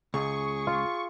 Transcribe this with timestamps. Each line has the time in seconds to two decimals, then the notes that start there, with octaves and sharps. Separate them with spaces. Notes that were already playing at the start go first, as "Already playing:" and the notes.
0.14 C#2 G#4 C#6
0.67 F4